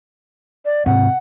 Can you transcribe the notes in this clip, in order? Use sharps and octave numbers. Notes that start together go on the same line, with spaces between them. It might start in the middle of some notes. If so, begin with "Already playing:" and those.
D5
G#2 C3 C4 F#5